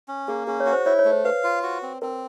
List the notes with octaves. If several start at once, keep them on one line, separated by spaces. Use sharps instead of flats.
C#4
A#3 G#4
C#4 G#4
C#5
F#4
C5
E4 C#5
C#5
A3
C5
B4 F5
F4
F#4
C4
C4 A#4